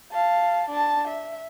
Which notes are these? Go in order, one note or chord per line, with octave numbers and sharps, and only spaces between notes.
F5 A5
D4 A5
E5